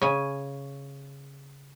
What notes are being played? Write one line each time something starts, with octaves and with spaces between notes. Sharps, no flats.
C#3 G#5